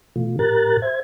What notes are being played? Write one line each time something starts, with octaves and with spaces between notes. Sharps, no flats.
B2 E3 A3 F4
A2 G4 A#4 A#5 F#6 A6
C5 E5 G#6